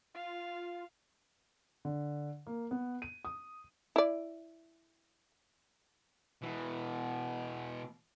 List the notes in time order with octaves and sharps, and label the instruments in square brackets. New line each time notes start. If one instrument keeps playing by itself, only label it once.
[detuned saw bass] F4 [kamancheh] F5
[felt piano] D3
A#3
B3
D#7
D#6
[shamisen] E4 D5
[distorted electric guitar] B2 E3